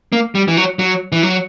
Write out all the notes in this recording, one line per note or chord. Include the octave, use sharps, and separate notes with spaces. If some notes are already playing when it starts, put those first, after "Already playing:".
A#3
G3
E3
F#3
F#3
E3
F#3